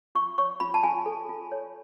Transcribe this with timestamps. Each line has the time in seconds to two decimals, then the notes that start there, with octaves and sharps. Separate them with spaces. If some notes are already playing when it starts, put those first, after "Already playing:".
0.15 F4 C#6
0.38 C#5 C#6
0.60 F4 B5
0.74 A5
0.83 F4 G#5
1.06 A4
1.29 F4
1.52 C#5